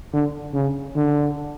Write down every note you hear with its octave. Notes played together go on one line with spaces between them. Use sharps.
D3
C#3
D3